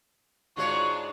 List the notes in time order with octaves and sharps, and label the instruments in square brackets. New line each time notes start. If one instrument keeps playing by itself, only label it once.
[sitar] G#2 G#3 C#5 [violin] D4 F4 [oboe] F#4